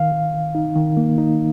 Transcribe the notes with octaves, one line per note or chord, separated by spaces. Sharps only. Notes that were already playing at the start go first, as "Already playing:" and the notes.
Already playing: D#3 F5
D#3
D#3
D#4
D#3
A#3
D#4